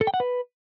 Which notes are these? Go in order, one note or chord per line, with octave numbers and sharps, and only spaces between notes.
A4
G5
F#5
B4